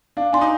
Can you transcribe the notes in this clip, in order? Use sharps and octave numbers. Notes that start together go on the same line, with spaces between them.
D4 F5
D4 G#5 C6
D#4